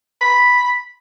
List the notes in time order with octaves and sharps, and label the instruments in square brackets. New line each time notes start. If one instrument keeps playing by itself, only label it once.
[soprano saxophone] B5